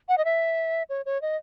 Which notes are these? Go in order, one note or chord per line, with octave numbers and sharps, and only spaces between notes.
F#5
D#5
E5
C#5
C#5
D#5